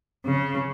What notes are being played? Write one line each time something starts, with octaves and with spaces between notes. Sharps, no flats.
C#3